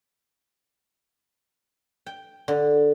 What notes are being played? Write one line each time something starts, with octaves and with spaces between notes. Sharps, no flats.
G5
D3